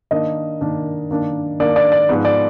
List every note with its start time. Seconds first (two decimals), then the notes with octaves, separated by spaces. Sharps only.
0.11 D#3 A#3 D4 D#5
0.61 D#3 A#3 D4
1.11 D#3 A#3 D4
1.60 D#3 A#3 D4 D5
1.76 D5
1.92 D5
2.09 G#2 F3 B3
2.25 D5